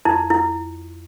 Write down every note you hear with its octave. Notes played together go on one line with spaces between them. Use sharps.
F2 E4
E4